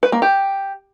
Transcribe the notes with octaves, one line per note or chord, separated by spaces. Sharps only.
B4
A#3
G4